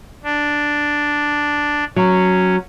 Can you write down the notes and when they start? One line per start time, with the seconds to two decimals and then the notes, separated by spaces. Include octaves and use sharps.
0.23 D4
1.96 F#3 C#4